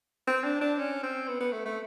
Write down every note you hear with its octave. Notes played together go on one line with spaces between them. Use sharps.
C4
D4
D4
C#4
C4
B3
B3
A3
A3